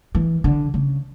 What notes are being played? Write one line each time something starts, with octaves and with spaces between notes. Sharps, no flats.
E3
D3
C#3